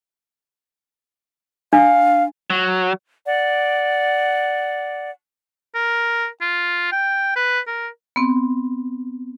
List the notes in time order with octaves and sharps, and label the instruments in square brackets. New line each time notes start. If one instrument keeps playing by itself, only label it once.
[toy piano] D4 [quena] F5
[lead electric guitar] F#3
[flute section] D5 F#5
[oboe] A#4
F4
G5
B4
A#4
[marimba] B3 C4